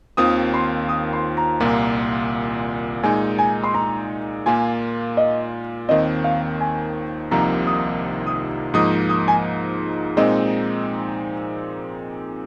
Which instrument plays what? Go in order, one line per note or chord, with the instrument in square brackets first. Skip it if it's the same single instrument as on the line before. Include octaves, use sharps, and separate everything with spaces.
[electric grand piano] D#2 D#3 C4 F4 [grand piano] D#6
[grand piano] C6
D#6
C6
A#5
[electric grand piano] C2 A#2 A#3 F4
[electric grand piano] A#2 G#3 D#4 [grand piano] G#5
[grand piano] G#5
C6
A#5
[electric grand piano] A#2 A#3 F4 [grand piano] G#5
[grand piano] D#5
[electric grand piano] D#2 D#3 C4 [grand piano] D#5
[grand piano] F5
G#5
[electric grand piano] C2 C3 F3 A#3 D#4 [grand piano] A#5
[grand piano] D#6
D#6
[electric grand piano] G#2 F3 A#3 D#4 [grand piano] D#6
[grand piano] D#6
G#5
[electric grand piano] A#2 G#3 C4 D#4 [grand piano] D#5